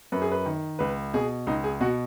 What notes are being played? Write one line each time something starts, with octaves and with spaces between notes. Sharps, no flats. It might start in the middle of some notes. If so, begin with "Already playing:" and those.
F#2 B4
G#4
B4
D#3
C#2 B4
B2 G#4
C#2 D#4
G#4
B2 F#4